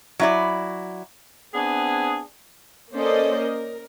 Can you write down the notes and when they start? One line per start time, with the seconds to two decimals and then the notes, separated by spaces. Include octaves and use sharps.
0.19 F#3 E4 D5
1.54 B3 C4 D4 G#4
2.93 A#3 C#4 A4 C5 D5 D#5
3.39 A#4